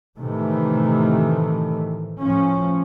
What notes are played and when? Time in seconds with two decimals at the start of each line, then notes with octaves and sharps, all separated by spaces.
0.17 A2 C3 D#3 E3 A3
2.19 A2 F3 C#4